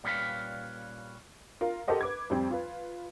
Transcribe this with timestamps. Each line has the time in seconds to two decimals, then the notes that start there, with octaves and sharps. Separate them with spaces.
0.04 A#2 G3 C#4 G4 B4 F5
1.61 F4 A#4
1.88 G4 A4 A#4 C5 D#5 F#5
2.01 B4 D6 G#6
2.30 F2 G3 C4 G5
2.51 F4 B4